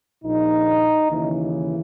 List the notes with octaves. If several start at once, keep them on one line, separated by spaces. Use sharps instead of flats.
A#1 A#2 D#4
D#2 C#3 E3